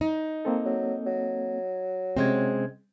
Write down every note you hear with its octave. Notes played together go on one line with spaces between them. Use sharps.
D#4
A#3 C4 A4
F#3
F#3
C3 G#3 C4 C#4 G#6